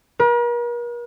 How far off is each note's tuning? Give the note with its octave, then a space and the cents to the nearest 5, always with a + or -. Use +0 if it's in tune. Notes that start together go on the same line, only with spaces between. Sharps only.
A#4 +45